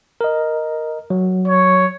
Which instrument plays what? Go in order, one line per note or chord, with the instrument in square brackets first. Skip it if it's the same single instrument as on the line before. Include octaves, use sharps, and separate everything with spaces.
[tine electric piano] A#4 D#5
F#3
[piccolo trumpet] C#5